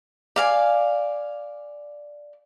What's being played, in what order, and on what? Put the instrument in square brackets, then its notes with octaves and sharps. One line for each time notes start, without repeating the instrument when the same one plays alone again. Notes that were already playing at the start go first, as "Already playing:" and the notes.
[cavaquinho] D5 F5 G#5